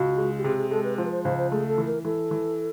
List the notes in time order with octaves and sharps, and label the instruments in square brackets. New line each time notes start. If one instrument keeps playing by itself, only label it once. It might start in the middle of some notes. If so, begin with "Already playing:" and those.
Already playing: [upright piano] C#2 [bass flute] F#4
[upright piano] G#3
[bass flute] G4
[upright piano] C3 [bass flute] G#4
[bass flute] G#4
[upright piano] G#3 [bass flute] A4
[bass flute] B4
[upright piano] F3 [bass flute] C5
[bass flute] B4
C5
[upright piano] C#2 [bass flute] C5
[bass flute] C5
[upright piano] A3 [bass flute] G#4
[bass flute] A4
[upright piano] E3
[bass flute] A#4
[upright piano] E3 [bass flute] A4
[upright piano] E3